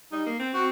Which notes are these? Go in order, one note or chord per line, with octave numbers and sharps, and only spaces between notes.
G3 D#4
A#3
C4
C4 F#4